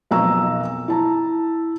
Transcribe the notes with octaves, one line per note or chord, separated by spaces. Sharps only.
B1 F2 A#4 A#5 C#6 E6
E4 A5 A#5